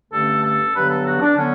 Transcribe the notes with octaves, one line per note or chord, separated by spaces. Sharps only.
G2 D3 A3 C#4 A4
A4
G2 D3 F#3 B3 B4
A4
F#4
D4
D3 F#3 B3 C#4